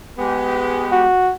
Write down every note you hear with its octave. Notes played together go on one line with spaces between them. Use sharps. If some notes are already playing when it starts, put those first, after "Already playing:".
G#3 B3 G4
F#4